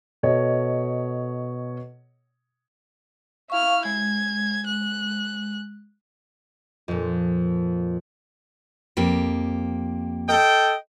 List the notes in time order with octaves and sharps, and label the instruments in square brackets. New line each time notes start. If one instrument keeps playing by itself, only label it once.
[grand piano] B2 A4 C#5 D#5
[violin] E4 F6 [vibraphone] F5 C#6
[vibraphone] G#3 [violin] G#6
[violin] F#6
[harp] F2 A#2
[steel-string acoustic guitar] F2 A#3 G4
[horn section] A4 D#5 G5